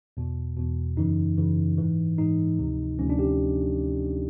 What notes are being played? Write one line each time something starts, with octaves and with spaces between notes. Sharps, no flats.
E2 B2
E2 B2
F#2 C#3 E3 D#4
F#2 C#3 E3
G#2 E3
G#2 E3 D#4
D2 C3 F3
D2 C3 F3 C#4
D4
G4